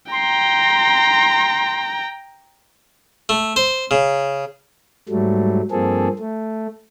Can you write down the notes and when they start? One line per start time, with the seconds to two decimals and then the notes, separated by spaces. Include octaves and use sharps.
0.12 G5 A#5 C6
3.29 A3
3.56 C5
3.91 C#3
5.09 G#2 F#3 G3 A3
5.71 G2 F3 A#3 C4 G#4 A4
6.19 A3